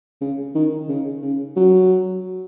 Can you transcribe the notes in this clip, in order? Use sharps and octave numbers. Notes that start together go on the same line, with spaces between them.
C#3
D#3
C#3
C#3
F#3